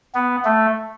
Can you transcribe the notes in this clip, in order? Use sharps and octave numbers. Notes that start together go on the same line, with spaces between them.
B3
A3